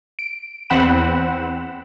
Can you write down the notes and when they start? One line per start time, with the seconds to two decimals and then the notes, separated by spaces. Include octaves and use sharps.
0.19 D7
0.70 E2 C4 F#5 B5 E7